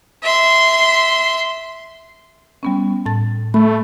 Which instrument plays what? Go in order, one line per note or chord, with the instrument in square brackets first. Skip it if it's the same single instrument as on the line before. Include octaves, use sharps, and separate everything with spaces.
[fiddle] E5 C6
[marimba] G3 B3 C#4
A2 A5 A6
[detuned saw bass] A3 [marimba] B5